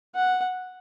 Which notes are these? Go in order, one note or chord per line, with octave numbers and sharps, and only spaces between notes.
F#5